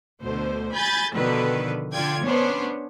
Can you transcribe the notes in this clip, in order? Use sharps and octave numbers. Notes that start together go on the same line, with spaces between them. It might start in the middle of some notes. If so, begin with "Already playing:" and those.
D2 B2 D3 C5
G#5 B5 G6 A6
B2 D3 D#3 F3 A4 B4
D3 F4 D5 G5 G#6
B3 C#4 D4 C5 C#5